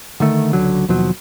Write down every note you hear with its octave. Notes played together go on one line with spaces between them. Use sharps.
D3 D#3 A3
C#2 D3 F#3
D#2 B2 F3 F#3